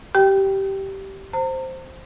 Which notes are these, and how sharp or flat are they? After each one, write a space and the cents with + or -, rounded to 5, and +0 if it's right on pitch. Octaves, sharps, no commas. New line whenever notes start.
G4 -15 G5 +0
C5 +0 A#5 -40